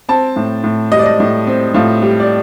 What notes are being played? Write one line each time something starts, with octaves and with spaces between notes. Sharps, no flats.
C4 A5
A2
A2
G3 D#5
D5
D#5
A2
C4
A2 F4
G3 G4
D5